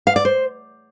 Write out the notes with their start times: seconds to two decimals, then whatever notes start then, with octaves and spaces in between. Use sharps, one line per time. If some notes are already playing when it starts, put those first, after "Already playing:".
0.07 F5
0.16 D5
0.25 C5